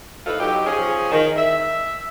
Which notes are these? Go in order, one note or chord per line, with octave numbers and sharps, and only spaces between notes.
A2 D#4 F4 A4 B4
F#3 D#4 G4
F3 C#4 G#4
D#3
E5